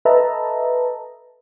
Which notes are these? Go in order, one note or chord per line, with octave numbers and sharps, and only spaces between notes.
A4 B4 D#5 E5 A5 A#5